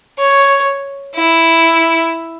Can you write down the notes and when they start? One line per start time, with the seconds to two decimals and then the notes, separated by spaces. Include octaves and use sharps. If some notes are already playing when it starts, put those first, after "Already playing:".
0.18 C#5
1.15 E4